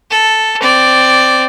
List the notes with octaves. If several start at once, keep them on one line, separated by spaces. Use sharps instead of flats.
A4
C4 D5